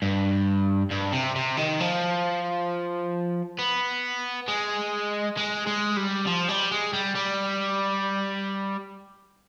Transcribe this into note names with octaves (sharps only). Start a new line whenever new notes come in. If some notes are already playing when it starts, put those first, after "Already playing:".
G2
G2
C3
C3
D#3
F3
B3
G#3
G#3
G#3
G3
F3
G3
G#3
G3
G3